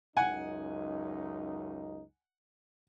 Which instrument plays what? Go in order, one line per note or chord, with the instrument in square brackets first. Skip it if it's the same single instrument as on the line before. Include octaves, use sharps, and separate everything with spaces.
[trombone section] C#2 F#2 D#4 [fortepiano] F#5 G#5